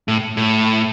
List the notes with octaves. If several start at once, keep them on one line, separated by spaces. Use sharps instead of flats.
A2
A2